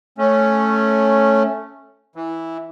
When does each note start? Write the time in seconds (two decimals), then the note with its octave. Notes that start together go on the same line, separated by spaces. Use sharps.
0.18 A3 C#4
2.16 E3